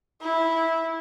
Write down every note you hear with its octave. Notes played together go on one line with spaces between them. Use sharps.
E4